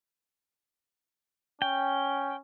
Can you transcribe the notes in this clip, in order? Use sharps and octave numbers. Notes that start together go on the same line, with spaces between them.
C#4 G5